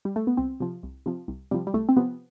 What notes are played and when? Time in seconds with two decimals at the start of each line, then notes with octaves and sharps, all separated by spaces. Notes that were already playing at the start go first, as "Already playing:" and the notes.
0.05 G3
0.16 A3
0.27 B3
0.37 C2 C4
0.60 C3 F3
0.83 C2
1.06 C3 F3
1.28 C2
1.51 C3 F3 G3
1.67 G3
1.74 C2 A3
1.89 C4
1.97 C3 F3 B3